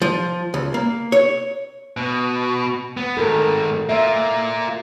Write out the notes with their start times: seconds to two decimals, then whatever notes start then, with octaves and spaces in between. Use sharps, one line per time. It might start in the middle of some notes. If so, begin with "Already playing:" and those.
0.02 F3
0.54 C#2
0.74 A#3
1.12 C#5
1.97 B2
2.97 B3
3.17 G#2 D#3 A4 A#4
3.89 A#3 F4 E5